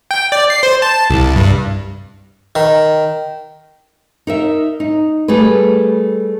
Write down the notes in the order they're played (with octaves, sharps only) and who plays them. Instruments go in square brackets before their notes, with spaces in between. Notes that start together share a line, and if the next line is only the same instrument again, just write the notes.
[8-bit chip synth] G5
D5
C7
C5
A5
C2
G2
[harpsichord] D#3
[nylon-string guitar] D#4 A#4 E5
D#4
G3 A3 G#4 B4